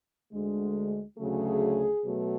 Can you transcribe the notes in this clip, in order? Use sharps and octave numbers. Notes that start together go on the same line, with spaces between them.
D2 D3 G#3
D2 C#3 F#3 A3 G#4
B2 F#3 A3